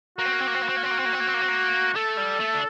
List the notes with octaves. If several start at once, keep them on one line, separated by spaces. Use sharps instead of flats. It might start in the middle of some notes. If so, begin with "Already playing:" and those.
A#3 F#4
C4
A#3
C4
A#3
C4
A#3
C4
A#3
C4
A#3
C4
A#3
C4
A#3
C4
A#3
C4
A#3
A3 A4
G3
A3
D4